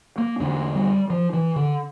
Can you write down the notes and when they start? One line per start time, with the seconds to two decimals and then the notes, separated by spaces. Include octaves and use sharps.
0.18 A#3
0.40 E2 D3 D4
0.75 G3
1.10 F3
1.33 E3
1.56 D3